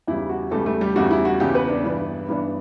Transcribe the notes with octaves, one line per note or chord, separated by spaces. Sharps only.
E2 C#3 G3 E4
F#4
E2 C#3 G3 A3 A4
A3 A4
G3 G4
E2 C#3 G3 F#4
E4
F#4
E2 C#3 G3 G4
B3 B4
D4 D5
G2 E3 B3 D4
G2 E3 B3 D4